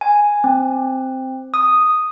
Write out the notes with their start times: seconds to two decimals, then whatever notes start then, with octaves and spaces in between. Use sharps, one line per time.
0.01 G#5
0.44 C4
1.54 D#6